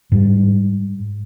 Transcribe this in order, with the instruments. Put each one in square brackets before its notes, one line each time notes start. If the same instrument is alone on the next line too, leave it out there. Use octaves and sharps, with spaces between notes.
[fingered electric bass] G#2 G3